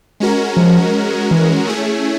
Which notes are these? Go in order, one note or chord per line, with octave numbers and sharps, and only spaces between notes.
G#3 C#4 F#4 A#4
F3
E3
A3 C#4 E4 G#4